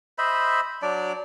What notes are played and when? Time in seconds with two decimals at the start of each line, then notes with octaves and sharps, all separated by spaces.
0.18 C5 D#5 E5 B5
0.82 F#3 D4 D5